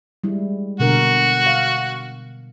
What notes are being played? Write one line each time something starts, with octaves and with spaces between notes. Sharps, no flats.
G3 G#3 E4
B2 D3 F#4 A#4
F5